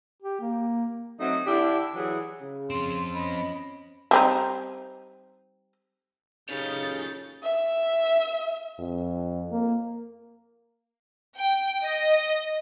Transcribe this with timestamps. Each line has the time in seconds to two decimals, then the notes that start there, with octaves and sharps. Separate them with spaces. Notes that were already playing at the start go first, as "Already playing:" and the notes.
0.22 G4
0.41 A#3
1.20 F#3 A3 C4 D#4
1.46 D3 D4 E4 G4
1.96 E3 F#3 E4 G#4
2.41 C#3
2.70 F3 C4 C6
3.14 C#4 D#5 B5
4.11 G3 C4 D#4
6.49 C#3 D#4 G4 A4 C#5 G6 A6
7.43 E5
8.79 F2
9.51 A#3
11.38 G5
11.84 D#5